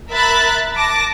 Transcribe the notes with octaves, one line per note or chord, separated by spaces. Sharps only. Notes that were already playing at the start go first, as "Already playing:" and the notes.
A#4 E5 B5 F#6 A6
A5 D6 A#6